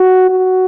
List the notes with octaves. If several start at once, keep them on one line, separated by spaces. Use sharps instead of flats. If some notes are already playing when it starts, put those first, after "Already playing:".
Already playing: F#4
F#4